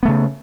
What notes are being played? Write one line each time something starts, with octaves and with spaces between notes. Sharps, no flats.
C#3 A3 B3